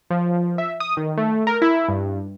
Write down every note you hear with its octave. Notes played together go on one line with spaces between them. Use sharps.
F3
E5
D#6
D#3
A3
A#4
E4
G2